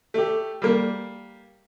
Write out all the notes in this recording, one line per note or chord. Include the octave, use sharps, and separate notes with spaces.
A3 G4
G3 A#3